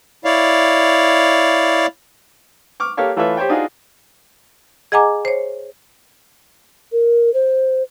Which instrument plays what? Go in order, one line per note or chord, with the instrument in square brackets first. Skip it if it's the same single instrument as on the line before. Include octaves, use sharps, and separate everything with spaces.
[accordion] E4 C#5 D5 F5
[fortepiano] C#6 D6 F6
A#3 G4 A4 C#5 F5
E3 A3 F4 B4 C#5 E5
G4 C5 C#5 G5
D4 D#4 F4 F#4 G#4
[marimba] G#4 D#5 F#5 G#5 A#5 D6
C5 C#5
[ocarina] A#4
C5